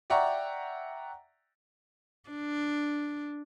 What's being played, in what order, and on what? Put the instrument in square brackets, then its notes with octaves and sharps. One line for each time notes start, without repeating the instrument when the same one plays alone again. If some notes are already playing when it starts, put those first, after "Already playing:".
[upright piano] D5 E5 F#5 G5 A#5 C#6
[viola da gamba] D4